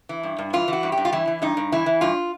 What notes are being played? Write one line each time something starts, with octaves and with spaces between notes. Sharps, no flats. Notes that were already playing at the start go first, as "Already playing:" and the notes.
E3
G2
G2
E3 F4
E3 F#4
G2
G4
G2
F4
E3 E4
E3
G2 D#4
G2
E3 E4
E3
G2 F4